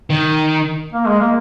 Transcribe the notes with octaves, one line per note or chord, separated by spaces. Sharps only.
D#3
A#3
G#3
A#3